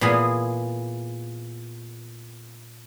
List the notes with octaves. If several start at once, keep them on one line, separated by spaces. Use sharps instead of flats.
A#2 E3 B3 G#4 G#5